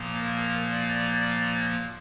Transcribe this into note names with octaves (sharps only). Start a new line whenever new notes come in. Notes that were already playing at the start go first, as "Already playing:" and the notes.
Already playing: A#2 F3 A#3
A#4
D5